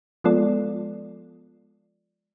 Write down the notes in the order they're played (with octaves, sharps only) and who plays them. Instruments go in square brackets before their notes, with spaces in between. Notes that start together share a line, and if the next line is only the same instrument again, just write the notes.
[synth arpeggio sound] F3 G#3 B3 F4 A4 D5